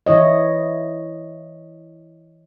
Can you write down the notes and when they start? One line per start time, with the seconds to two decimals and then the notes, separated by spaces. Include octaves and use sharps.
0.06 E3 E4 C#5 D#5